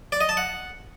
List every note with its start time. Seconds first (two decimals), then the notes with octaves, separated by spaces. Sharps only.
0.12 D5
0.21 D#5
0.29 A5
0.37 F#5